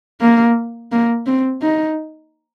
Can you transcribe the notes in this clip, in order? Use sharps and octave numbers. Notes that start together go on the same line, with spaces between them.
A#3
A#3
C4
D#4